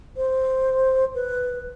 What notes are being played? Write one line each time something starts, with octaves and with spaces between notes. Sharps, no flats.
C5
B4